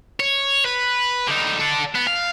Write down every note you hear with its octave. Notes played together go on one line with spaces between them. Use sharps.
C#5
B4
D3 D#4
A4 D5
B3
F5